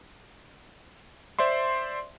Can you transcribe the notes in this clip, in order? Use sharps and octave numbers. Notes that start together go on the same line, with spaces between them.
C5 D5 E5 C6